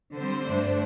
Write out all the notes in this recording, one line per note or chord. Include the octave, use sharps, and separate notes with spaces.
D3 G3 C4 C5
G2 D3 A3 D4